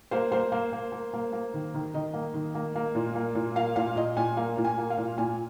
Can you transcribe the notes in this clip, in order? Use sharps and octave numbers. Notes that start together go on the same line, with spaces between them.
A#3 C5
A#3 C5
A#3
A#3
A#3
A#3
A#3
D#3
D#3
D#3 D#5
A#3
D#3
A#3
A#3
A#2
A#3
A#2
A#3 F5
A#2 F5
A#2 D#5
A#2 G#5
A#3 F5
A#2
G#5
A#3
F5
A#2
A#2 G#5